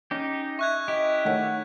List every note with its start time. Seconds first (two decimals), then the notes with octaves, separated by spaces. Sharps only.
0.11 C#4 D#4 G4
0.59 E5 C#6 F#6 G#6
0.88 E4 G4 D#5
1.25 D#3 A3 C#5 F#5